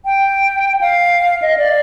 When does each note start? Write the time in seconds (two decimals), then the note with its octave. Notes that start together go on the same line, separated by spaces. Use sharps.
0.05 G5
0.81 F5
1.42 D#5
1.58 D5